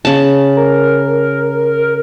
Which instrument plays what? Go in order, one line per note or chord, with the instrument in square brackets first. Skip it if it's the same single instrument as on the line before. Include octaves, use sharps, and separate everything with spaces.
[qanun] C#3 A5
[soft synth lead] A#4